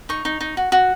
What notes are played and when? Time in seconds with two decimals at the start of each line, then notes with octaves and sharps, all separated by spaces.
0.09 D#4 C#6
0.25 D#4
0.41 D#4
0.57 F#4
0.72 F#4